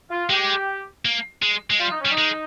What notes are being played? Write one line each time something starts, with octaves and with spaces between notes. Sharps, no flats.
F4
G#3 G4
A#3
G#3
G#3
G3 F4
D#4
C#4
G3
D#4
G#3